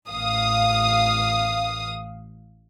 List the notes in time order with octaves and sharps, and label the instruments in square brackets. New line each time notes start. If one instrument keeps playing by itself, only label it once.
[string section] A1 F5 D#6